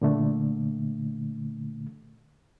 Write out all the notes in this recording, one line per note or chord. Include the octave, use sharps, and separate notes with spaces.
A#2 D3 A3